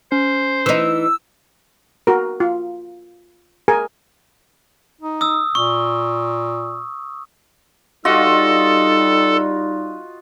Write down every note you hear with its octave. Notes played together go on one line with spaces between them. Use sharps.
C#4 C5
E3 D#4 E6
F#4 A#4
F4
G#4 A#4 G#5
D#4
D#6 E6
A#2 C#6
G3 D#4 F4 F#4 A4 D#5